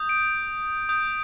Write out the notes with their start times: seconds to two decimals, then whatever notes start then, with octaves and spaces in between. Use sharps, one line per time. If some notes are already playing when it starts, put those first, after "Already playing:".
Already playing: D#6 G6
0.09 D7
0.89 D#6 G6